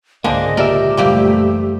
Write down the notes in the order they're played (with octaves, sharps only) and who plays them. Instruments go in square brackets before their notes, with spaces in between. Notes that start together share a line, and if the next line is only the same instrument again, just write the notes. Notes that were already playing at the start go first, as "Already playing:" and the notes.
[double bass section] C#2 G#2 [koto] D3 G#3 C4 [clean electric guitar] A#3 [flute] D#5
[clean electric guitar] A#2 D5 E5 [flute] G4 [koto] A#4
[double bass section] F#1 E3 A3 [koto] G3 A#3 C4